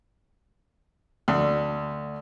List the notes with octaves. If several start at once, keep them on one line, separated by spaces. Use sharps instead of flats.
D2